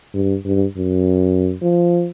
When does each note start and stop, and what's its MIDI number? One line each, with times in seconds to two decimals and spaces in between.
0.14 0.36 43
0.45 0.65 43
0.77 1.54 42
1.62 2.09 53